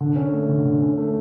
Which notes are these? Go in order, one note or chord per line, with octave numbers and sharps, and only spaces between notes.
D3
C#4
A3
D3
D3
C#4
A3